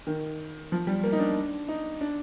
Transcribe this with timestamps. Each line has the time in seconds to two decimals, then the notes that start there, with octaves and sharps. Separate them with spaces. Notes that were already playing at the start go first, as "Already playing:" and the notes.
0.07 D#3
0.72 F3
0.87 G3
1.03 A#3
1.13 D#4
1.19 D4
1.68 D#4
2.01 D4